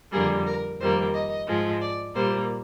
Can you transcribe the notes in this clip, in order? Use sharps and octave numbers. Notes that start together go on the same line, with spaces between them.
F2 D3 G3 A#3 G#4
A#4
F2 D#3 G3 A#3 C5
D#5
G#2 F3 G#3
D5
A#2 G3 A#3 C5